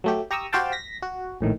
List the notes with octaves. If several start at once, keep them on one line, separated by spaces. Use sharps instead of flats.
F#3 A3 G4
G4 A#5 C#6 D#6 E6
F#4 G4 C5 F5 G5 A5
A#6 B6
F#4
A#1 A2 D#3